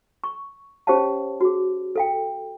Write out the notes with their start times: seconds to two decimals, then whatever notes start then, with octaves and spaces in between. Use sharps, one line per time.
0.24 C#6
0.87 C#4 G4 C5 C#5 F5 A5
1.41 F#4 G#4
1.96 A4 F5 G5